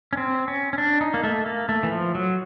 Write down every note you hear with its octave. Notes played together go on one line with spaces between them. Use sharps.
C#4
C4
C#4
C#4
D4
D#4
A#3
A3
A#3
A3
E3
F3
F#3